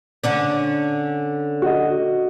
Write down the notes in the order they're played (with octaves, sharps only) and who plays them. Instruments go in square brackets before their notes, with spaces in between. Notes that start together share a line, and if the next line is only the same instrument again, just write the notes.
[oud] D3 C#4 D4
[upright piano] F#4 D#5